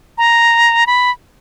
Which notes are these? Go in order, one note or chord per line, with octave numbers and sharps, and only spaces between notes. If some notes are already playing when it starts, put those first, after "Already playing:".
A#5
B5